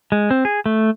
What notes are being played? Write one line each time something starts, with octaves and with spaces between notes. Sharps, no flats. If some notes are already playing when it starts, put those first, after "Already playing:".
G#3
C4
G#4
A3